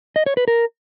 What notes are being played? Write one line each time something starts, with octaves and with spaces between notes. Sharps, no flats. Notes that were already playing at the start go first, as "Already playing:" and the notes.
D#5
C#5
B4
A#4